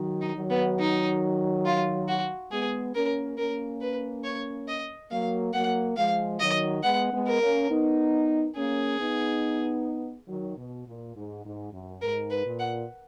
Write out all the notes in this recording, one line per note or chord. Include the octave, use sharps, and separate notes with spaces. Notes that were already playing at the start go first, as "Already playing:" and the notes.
Already playing: D#3 F#3
D#4
D#3 F#3
B3
D#4
F4
F#4
G#3 B3 G#4
A#3 C#4 A#4
A#3 C#4 A#4
B4
C#5
D#5
F#3 A#3 F5
F#3 A#3 F#5
F3 G#3 F5
D#3 F#3 D#5
G#3 B3 F#5
G#3 B3
A#4
A#3 C#4
B3 D#4
A#3 C#4 G#4
B3 D#4
D#3 F#3
B2
A#2
G#2
G#2
F#2
G#2 A#4
B4
A#2
F#5